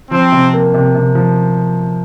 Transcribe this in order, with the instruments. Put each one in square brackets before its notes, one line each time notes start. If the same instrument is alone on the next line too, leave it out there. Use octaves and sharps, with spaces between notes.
[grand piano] F3 [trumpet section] C4
[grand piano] C3
A#3
C3
C3
F3